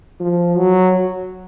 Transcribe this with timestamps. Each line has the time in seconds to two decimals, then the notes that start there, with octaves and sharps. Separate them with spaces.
0.20 F3
0.57 F#3